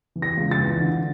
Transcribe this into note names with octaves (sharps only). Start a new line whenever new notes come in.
E3
A#6
C#2
A6
E3
D3